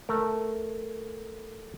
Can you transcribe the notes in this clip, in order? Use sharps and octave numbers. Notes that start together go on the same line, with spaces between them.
A3 A#4